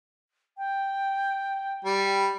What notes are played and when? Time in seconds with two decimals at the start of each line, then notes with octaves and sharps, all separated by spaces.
0.57 G5
1.85 G3